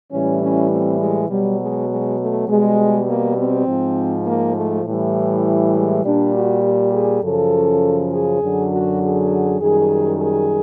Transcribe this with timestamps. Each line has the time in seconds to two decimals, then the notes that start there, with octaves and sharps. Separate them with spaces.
0.11 A2 E3 G3 C#4
0.41 C#4
0.70 C4
1.00 G#3
1.30 B2 F#3 G3
1.59 G#3
1.89 G#3
2.18 A3
2.48 B2 G3 G#3
3.08 A#3
3.37 C4
3.67 G#2 F3
4.26 A#3
4.56 A3
4.85 A2 E3 G3
5.76 G#3
6.05 A#2 G3 D4
6.34 F#4
6.64 G4
6.93 G#4
7.23 F#2 C#3 F3 A4
8.13 G#4
8.42 F#2 D3 F#3
8.72 F#4
9.02 G#4
9.60 F#2 D#3 G3 G#4
10.20 G#4